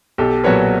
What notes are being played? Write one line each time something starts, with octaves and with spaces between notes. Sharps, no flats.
B1 G4 A4
A#2 F#3 B3 B4 C#5